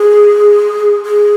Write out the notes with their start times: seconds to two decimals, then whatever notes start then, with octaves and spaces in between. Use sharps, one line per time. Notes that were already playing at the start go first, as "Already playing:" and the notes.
Already playing: G#4
1.05 G#4